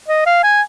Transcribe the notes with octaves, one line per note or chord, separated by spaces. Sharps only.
D#5
F5
G#5